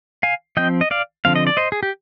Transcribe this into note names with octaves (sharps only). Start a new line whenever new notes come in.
F5 G#5
F3 C4 D#5 G5
D#5
D5 F5
D3 F3 C4 F5
D#5
D5
C5 D#5
G#4
G4